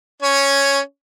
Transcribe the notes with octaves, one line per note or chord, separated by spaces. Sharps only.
C#4 C#5